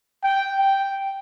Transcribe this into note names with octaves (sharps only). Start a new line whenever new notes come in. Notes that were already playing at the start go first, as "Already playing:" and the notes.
G5
G5